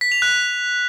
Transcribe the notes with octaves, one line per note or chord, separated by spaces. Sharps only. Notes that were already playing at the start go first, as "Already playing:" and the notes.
B6
F7
F#6